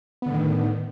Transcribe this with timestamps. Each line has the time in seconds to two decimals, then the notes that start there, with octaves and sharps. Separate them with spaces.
0.22 B3
0.26 D3
0.30 A2
0.34 D#3